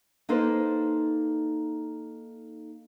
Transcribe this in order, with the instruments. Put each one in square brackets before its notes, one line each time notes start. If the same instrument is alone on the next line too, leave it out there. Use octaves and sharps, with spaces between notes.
[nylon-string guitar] A#3 D#4 A4 B4 C5